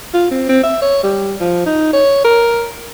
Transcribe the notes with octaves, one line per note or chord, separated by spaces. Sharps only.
F4
C4
C4
E5
C#5
G3
F3
D#4
C#5
A#4